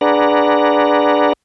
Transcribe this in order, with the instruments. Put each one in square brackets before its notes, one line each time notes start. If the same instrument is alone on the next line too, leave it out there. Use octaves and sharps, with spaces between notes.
[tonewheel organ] D4 G#4 B4 D5 F#5 A#5